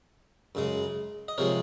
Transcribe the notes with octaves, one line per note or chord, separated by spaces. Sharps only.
F#2 C#3 G#3
D#5
C3 F3 G#3 A#4 C#5